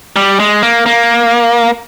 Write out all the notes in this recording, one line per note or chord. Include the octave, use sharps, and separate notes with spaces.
G3
G#3
A#3
A#3